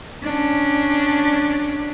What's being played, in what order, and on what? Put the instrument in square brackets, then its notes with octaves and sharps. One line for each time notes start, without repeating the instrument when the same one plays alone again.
[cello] C#4 D4